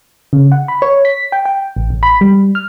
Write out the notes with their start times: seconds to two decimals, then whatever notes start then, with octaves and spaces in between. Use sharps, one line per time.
0.33 C#3
0.52 F#5
0.68 B5
0.82 C#5
1.05 B6
1.32 G5
1.45 G5
1.76 A1
1.90 A1
2.03 B5
2.21 G3
2.55 F6